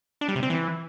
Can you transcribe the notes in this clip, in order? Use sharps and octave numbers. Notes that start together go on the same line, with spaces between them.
D4
G3
C3
C4
E3